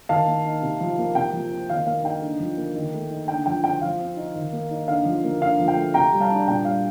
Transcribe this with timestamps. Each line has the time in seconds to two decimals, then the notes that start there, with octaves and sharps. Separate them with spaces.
0.09 D#3 F5 A5
0.27 A#3
0.45 D#4
0.62 C3
0.80 F3
0.98 A#3
1.15 C3 G5
1.33 F3
1.51 C4
1.69 D#3 F5
1.86 A#3 F5
2.04 D#4 G5
2.22 D3
2.40 F3
2.57 A#3
2.75 D#3
2.94 A3
3.11 D#4
3.28 D3 G5
3.46 F3 G5
3.64 C4 G5
3.82 F3 F5
4.00 C4
4.17 D#4
4.35 D#3
4.53 A#3
4.71 D#4
4.88 D3 F5
5.05 F3
5.24 A#3
5.41 D3 F5
5.59 F3
5.68 G5
5.76 A3
5.94 C3 G5 A#5
6.13 G3
6.21 F5 A5
6.30 D4
6.48 A#2 G5
6.65 G3 F5